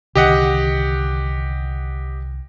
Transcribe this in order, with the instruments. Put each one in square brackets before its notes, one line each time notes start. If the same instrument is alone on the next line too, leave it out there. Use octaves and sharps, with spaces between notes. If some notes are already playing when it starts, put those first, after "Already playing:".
[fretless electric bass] C2 D3 D#3 [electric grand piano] G4 D#5 F#5